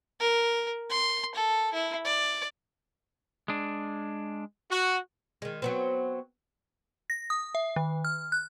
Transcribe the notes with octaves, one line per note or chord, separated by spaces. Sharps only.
A#4
C6
A4
E4
D5
G#3 D4
F#4
D#3 G#3
F#3 B3 C4
A#6
D#6
E5
D#3
F6
F#6